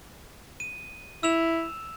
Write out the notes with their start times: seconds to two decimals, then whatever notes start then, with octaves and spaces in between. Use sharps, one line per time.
0.60 D#7
1.23 E4 E6 E7 F7